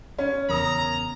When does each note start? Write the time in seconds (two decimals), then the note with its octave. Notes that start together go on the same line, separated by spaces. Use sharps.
0.19 C#4
0.49 E2 C#3 F4 A#4 A#5 D#6